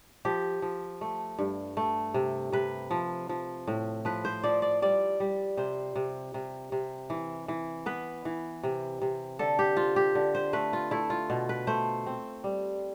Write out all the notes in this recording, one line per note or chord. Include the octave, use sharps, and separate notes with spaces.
F3 G4
F3
A3
G2
A3
C3
C3 B4
F3
F3
A2
F3 B4
C5
F3 D5
D5
G3 D5
G3
C3 C5
C3
C3
C3
E3
E3
B3 B4
E3
C3
C3
D3 A4
G4
C4 F4
G4
D3
C5
A3 B4
F4
A3 E4
F4
B2
B4
A3 C5
C4
G3